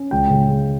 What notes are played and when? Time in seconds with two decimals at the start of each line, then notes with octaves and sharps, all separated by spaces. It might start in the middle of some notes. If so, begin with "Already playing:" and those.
Already playing: C#4
0.11 C#2 G5
0.30 C#3
0.49 G#3